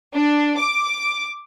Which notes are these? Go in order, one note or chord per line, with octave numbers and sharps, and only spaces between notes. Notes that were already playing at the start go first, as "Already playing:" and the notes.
D4
D6